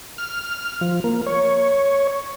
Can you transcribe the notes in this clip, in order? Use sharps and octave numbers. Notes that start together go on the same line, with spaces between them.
F6
F3
A#3
C#5